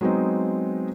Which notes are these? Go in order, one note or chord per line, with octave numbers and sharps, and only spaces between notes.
F#3 G#3 B3 C4 D#4